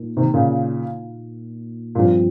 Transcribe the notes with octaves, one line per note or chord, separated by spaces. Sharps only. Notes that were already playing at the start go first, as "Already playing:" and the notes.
Already playing: A#2 D#4
C3 D#3
A#2 C#3
G2 A#2 F3 C4